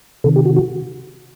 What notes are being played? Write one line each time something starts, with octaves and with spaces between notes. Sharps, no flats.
C3 D#3 A4
G4
F#4
F#4